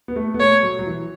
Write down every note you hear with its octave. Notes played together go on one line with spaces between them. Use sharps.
B3
A3
B3
A3 C#5
F#3
F#3
E3